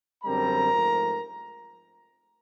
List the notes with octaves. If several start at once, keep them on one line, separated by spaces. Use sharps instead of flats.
F#2 D3 G3 C4 A#4 A#5
G#2 F3 A3